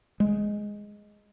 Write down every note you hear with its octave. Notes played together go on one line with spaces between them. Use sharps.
G#3